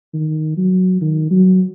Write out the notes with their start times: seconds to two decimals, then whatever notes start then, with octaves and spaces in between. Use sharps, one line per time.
0.14 D#3
0.57 F#3
1.01 D#3
1.31 F#3